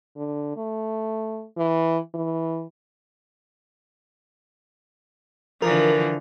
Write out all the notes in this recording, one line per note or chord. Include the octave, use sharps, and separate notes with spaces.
D3
A3
E3
E3
D3 E3 F3 A#4